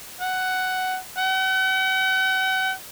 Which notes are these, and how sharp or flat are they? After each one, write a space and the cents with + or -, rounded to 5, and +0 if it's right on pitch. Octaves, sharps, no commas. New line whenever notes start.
F#5 +10
F#5 +40